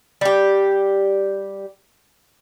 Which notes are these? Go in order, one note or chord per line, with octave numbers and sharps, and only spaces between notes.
G3 G4